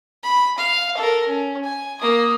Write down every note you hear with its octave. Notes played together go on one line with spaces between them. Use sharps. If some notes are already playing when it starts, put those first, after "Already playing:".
B5
F5
A4 A#4
C#4
G#5
A#3 D#6